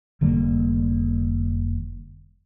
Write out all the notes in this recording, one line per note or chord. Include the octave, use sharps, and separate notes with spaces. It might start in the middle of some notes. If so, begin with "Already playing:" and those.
F1 D3 G3 A#3